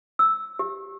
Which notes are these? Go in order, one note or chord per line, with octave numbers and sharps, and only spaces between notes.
E6
G4